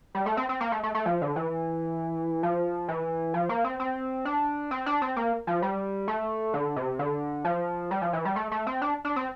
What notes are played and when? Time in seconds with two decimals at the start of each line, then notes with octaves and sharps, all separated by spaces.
0.15 G3
0.26 A3
0.37 C4
0.49 C4
0.61 A#3
0.72 A3
0.83 A3
0.95 A3
1.06 F3
1.22 D3
1.36 E3
2.43 F3
2.88 E3
3.34 F3
3.49 A#3
3.64 C4
3.80 C4
4.25 D4
4.71 C4
4.86 D4
5.02 C4
5.16 A#3
5.47 F3
5.62 G3
6.08 A3
6.54 D3
6.76 C3
6.99 D3
7.45 F3
7.91 G3
8.02 F3
8.13 E3
8.25 G3
8.36 A3
8.51 A3
8.67 C4
8.82 D4
9.05 D4
9.16 C4